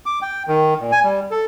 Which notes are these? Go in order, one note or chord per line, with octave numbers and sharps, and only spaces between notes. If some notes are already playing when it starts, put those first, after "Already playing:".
D6
G5
D#3
A#2
G#5
G3
A4